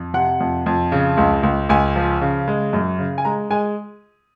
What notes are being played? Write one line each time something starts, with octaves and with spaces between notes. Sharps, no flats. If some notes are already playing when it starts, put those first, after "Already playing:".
Already playing: F2
C3 F#5
F2
F2
C#3
C#2
C#2
C#2 G#5
F3
C#3
G#3
F#2
C#3
G#5
G#3 A#5
G#3 G#5